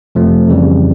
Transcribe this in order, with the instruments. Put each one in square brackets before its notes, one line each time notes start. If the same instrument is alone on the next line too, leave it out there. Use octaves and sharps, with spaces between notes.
[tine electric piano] F2 C3 F3 A3
F2 C#3 E3 G3